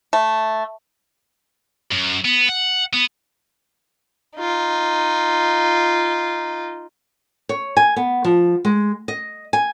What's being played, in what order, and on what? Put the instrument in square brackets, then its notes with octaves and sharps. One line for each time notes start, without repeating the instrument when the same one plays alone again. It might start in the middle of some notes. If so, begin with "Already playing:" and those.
[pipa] A3
[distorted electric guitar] F#2
B3
F#5
B3
[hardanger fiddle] D#4 F4
[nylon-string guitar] C#5
G#5
B3
F3
G#3
D#5
G#5